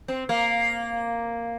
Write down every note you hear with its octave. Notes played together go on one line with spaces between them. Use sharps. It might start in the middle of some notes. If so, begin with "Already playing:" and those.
C4
A#3